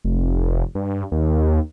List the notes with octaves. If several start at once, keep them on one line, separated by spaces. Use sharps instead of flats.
F1
G2
D#2